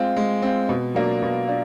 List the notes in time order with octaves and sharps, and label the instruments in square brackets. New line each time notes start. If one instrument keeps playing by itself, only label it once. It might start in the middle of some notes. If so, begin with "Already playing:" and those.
Already playing: [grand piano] G#3 C4 F4
G#3
C4 F4
B2
F#3 A#3 D4 F4
B2
D4 F4